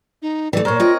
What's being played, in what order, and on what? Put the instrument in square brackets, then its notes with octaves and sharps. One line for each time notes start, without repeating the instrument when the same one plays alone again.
[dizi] D#4
[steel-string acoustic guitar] E3 A3 [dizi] D5
[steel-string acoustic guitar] A#2 C5 [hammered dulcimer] A#4 C#5
[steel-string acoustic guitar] C4 D#5 [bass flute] F4